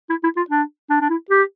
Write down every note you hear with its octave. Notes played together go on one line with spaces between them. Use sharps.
E4
E4
F4
D4
D4
D4
E4
G4